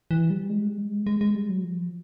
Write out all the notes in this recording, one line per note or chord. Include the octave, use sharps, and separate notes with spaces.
E3
G3
G#3
G3
G#3
G#3
G#3
G3
F#3
F3